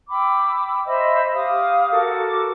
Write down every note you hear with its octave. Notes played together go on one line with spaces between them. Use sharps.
G5 B5 D6 E6
C5 D#5 E5 B5
G4 F5 D6 D#6
F#4 A4 A#4 D6